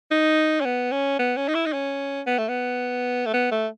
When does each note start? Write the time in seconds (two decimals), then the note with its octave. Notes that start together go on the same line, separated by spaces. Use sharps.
0.11 D#4
0.60 C#4
0.65 B3
0.92 C#4
1.19 B3
1.37 C#4
1.48 D#4
1.55 E4
1.66 D#4
1.73 C#4
2.27 B3
2.38 A3
2.48 B3
3.26 A3
3.34 B3
3.51 A3